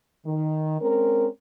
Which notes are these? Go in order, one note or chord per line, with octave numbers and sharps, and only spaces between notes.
D#3
G#3 C4 C#4 A#4